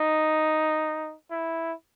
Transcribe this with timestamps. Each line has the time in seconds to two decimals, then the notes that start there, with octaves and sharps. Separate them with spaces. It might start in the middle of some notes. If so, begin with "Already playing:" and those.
Already playing: D#4
1.30 E4